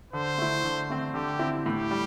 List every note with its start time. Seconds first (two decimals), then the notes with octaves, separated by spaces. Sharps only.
0.13 D3 C5
0.38 A3 E4
0.64 D3
0.90 A3 C4
1.14 D3 G4
1.39 C4 E4
1.66 A2 G4
1.91 G3